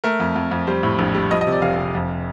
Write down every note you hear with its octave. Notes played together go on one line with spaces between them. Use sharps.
A3 A#4
F2
F2
F2
G3 C5
A2
A#1
G3
F3 D#5
D#5
C3
D5
F1 F5
F1
F2